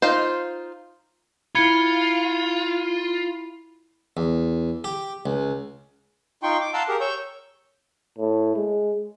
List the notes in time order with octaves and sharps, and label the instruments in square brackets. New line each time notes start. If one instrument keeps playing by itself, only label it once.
[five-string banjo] D#4 F4 C5
[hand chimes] E4 B5 [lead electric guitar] F4 [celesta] G#6 C#7 G7
[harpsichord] E2
G4
C#2
[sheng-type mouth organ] D#4 F4 G5 C6 C#6
D6
F5 F#5 A5 A#5 C6 E6
G4 G#4 A#4
C#5 C#6 E6 G6
[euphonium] A2
G#3